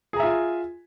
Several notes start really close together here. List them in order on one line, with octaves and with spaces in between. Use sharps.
G#4 A#5 E5 F4 G#5